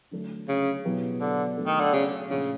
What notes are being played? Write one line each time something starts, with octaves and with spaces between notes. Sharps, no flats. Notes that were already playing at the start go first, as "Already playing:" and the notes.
D3 F#3 A3 D4
C#3
B2 F#3 B3 E4 G4
D3
F#3 A3 D4
D#3
D3
C#3
A#2 C#3 F3 A3 D4 F4